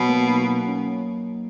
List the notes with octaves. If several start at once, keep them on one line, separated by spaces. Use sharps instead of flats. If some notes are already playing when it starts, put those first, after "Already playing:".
Already playing: B2 F#3 D#4
A#3
D#4
D#4
C#4